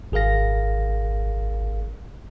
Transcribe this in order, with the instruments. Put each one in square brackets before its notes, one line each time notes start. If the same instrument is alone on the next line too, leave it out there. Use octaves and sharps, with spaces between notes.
[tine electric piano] G#1 G#4 A#4 F5 A#6